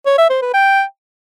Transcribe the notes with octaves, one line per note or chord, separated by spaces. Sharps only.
C#5
E5
C5
B4
G5